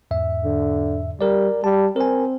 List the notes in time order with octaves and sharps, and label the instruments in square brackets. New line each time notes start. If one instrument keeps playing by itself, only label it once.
[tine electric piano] E2 G#2 E5
[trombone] D3
[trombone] G3 [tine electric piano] A#4 D5
[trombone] G3 [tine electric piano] A5
[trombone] C4 [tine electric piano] A#4 G#5